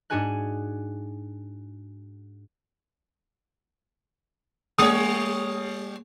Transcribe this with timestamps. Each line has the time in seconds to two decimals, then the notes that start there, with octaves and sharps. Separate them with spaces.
0.10 G#2 D4 F#4 G#4 G#5 F#6
4.78 G3 A3 A#3 G#4 C#5 D#6